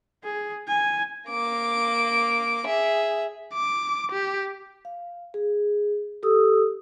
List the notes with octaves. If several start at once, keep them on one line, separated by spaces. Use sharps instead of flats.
G#4
G#5
A#3 D6
G#4 E5
D6
G4
F5
G#4
G4 A4 D#6 E6